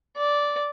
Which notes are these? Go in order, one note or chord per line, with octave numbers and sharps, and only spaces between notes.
D5